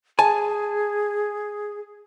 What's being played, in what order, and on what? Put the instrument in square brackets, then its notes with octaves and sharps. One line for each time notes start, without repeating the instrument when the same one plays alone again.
[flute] G#4 [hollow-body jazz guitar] G#5 A5